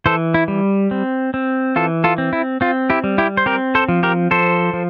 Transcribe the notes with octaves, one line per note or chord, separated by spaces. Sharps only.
E3 A4 C5
E4
G3
C4
C4
E3 F4 A4
F4 A4
C4
E4
C4 F4
E4 G4
G3
E4 G4
C5
C4 G4 A#4
A4 C5
F3
G4 A#4
F3 A4 C5
F3